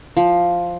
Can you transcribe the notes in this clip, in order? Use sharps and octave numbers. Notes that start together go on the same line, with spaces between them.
F3